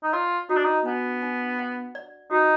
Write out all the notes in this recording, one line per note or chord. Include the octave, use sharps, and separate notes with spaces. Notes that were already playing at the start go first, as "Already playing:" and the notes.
D#4
F4 D5
D#4 F#4
D4
D#4
B3 D4
D4
F#5
D5
D#4 F#4